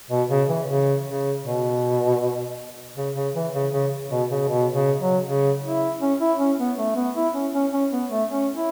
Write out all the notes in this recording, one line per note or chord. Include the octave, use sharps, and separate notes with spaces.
B2
C#3
E3
C#3
C#3
B2
C#3
C#3
E3
C#3
C#3
B2
C#3
B2
C#3
F#3
C#3
E4
C#4
E4
C#4
B3
A3
B3
E4
C#4
C#4
C#4
B3
A3
C#4
E4